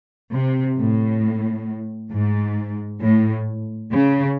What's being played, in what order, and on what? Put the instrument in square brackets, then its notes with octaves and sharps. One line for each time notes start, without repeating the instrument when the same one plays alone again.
[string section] C3
A2
G#2
A2
C#3